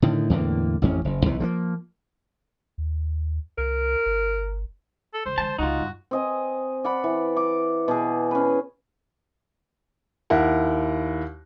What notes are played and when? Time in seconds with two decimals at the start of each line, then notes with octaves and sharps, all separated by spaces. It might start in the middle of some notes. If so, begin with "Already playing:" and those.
0.02 A2 D3 D#3
0.30 E2 A2 D3 A#3
0.82 A1 F2 C#4
1.05 F#1
1.25 B1 C3 E3
1.40 F3 A3 A#3
2.78 D#2
3.58 C2 A#4
4.06 G1
5.14 A4
5.26 C#2 C5
5.38 D3 G#3 A5
5.58 C#2 C3 D#4 F4 F#4
5.79 G2
6.11 C4 D#5 G#5
6.84 D5 F#5 B5
7.04 E3
7.36 D6
7.88 B2 G#4
8.31 C#4 B4
10.30 D#2 E4 A#4 F#5